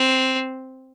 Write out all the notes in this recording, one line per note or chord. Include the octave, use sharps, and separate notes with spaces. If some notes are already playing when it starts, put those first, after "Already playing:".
Already playing: C4